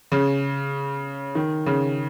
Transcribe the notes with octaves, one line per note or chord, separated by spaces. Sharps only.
C#3
D#3
C#3